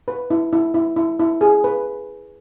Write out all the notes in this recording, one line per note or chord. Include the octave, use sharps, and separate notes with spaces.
B4
E4
E4
E4
E4
E4
G#4
B4